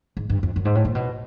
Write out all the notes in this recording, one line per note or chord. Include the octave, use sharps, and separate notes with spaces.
G#2
G2
F2
F#2
G#2
A2
A#2
B2